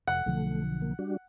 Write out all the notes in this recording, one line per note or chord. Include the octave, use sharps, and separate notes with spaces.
F1 F#5
B1 D3 F3 A3
A#3
G3 D4 F#4